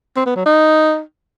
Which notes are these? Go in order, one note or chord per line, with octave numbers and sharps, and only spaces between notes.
C4
B3
F#3
D#4